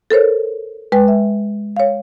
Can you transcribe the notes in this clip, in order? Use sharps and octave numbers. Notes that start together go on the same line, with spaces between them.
A4 A#4 C5 C#5
G#3 B4 G5
E5
C#5 F5